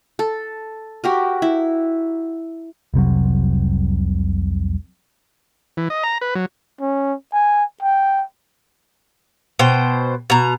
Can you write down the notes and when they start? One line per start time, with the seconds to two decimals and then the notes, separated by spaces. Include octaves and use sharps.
0.19 A4
1.04 F#4 G4 A#4
1.42 E4
2.94 F1 C2 C3 F#3
5.77 E3
5.90 D#5
6.03 A#5
6.21 B4
6.35 F#3
6.80 C#4
7.33 G#5
7.82 G5
9.59 B2 C5 G5
10.30 B2 A#5